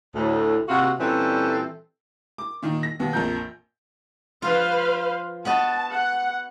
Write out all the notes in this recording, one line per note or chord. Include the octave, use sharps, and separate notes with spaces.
D2 A2
C3 A#3 F4 F#4
A#2 E3 G3 C4 C#4 A4
D6
A#2 D#3 D#4
A#6
D#2 B2 B3
A#1 F2 A#2 F3 A#4 G6
F3 F4 B4 C5 F5
B3 F#4 D#5 A5
F#5